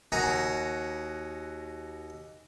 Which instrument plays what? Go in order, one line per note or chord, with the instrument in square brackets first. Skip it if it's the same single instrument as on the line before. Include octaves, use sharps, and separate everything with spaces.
[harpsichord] D#2 F#4 G#5 A#5